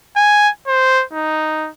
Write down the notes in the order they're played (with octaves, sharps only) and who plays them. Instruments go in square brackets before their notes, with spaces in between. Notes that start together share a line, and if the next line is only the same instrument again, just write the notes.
[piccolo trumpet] G#5
C5
D#4